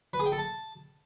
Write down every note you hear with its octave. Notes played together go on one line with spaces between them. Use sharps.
B4
G#4
G5
A4
A5